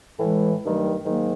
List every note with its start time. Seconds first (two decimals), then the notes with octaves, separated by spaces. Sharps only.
0.18 A2 E3 G#3
0.61 G2 D#3 F#3 A3
1.03 G#2 D#3 F#3 A#3